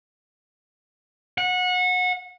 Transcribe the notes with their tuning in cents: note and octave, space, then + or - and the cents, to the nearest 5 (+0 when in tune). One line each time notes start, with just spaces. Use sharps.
F#5 -25